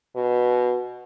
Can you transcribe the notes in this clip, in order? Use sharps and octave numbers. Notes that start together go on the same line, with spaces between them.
B2